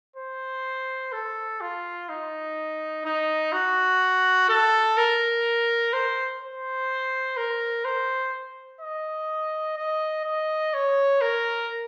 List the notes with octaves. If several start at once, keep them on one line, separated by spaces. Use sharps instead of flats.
C5
A4
F4
D#4
D#4
F#4
A4
A#4
C5
C5
A#4
C5
D#5
D#5
D#5
C#5
A#4